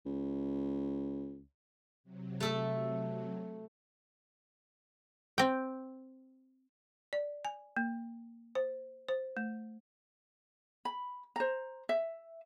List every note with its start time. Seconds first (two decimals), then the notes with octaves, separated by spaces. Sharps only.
0.06 C#2
2.04 C3 F#3
2.40 A3 A4 E5
5.38 C4 G5
7.13 D5
7.45 G#5
7.77 A#3
8.55 C5
9.08 C5
9.37 A3
10.85 B5
11.36 C5 A#5
11.89 E5